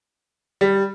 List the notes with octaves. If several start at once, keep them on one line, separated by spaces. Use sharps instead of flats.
G3